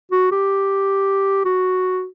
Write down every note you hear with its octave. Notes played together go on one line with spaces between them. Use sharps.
F#4
G4
F#4